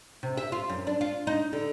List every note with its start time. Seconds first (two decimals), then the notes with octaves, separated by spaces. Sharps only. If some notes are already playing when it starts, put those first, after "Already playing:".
0.23 C3
0.37 E5
0.52 F4
0.69 F#2
0.87 D4
1.01 F4
1.27 D#4
1.53 D3